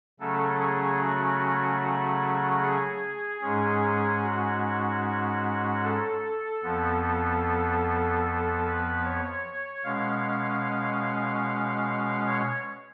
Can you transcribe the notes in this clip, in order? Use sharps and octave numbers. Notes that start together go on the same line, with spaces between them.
C#3 F#3 A3 C#4 A4
G#4
F#4
G#4
G#2 G#3 C#4 G#4
F#4
A4
F2 F3 B3
A4
B4
C#5
B2 G#3 C#4 F5
C#5